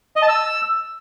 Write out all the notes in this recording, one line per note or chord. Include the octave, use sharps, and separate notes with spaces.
D#5
A5
E6